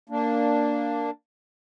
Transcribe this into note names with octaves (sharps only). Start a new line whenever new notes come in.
A#3 D4